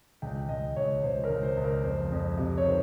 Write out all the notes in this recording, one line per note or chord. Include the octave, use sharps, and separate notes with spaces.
C#2 G5
C#2 D#5
C#2 C#5
C#2 C5
A#4
C#2
C5
C#2
A#4
F2 C5
F2
C3
C#5
D#3 C5